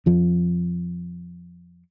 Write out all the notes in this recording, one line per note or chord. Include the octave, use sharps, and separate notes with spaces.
F2 F3